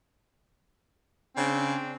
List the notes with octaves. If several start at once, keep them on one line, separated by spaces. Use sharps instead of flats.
C#3 C4 D4